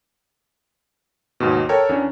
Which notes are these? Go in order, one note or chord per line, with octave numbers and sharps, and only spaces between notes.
D#2 G#2 B2
A4 A#4 C#5 G5 A5
E2 C#4 D4